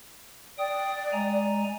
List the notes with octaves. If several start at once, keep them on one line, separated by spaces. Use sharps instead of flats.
D5 G5 D#6
G#3 G#5 A#5